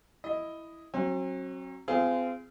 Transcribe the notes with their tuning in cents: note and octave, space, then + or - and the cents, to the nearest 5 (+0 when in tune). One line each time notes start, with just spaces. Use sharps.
E4 +0 D#5 +0
F#3 +0 C4 +45
C4 -35 F4 -25 G#4 +0